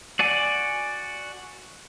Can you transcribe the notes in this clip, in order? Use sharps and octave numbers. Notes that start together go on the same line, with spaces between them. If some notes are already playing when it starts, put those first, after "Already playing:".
F#4 D5 F#5 G#5